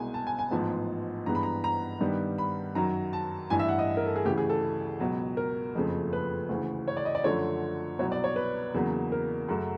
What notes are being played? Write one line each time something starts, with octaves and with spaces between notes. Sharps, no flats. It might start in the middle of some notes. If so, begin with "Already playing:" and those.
Already playing: C2 B2 G#3 G#5
A5
G#5
G#5
A1 G#2 F3 G#3 B3 A5
G2 E3 G#3 B3 A#5
B5
A#5
A#5
G2 D#3 G3 B3
B5
F#2 D#3 F#3 A#5
A5
A1 G2 E3 G#5
E5
F#5
D#5
A#4
A4
G#4
D2 C#3 E3 G4
G#4
A4
C#2 B2 F#3
A#4
F#1 F2 C#3 F3 A3
B4
D2 C#3 E3
C#5
D5
D#5
D5
F#2 D3 F3 A3 C#5
C2 B2 F#3 C#5
D5
C#5
B4
E2 C#3 F#3 A#3
A#4
F#2 C#3 F#3 A3